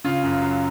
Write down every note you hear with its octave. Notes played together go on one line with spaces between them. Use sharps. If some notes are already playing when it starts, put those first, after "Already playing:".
C#3 F4
F#2
F#3